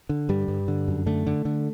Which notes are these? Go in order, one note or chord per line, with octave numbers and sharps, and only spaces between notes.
D3
G2 G3
G2
D3
F#2
D3 A3
D3
D3